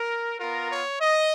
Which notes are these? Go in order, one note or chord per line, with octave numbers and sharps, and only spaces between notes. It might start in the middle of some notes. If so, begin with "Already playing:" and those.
Already playing: A#4
B3 F4 A#4
C#5
D#5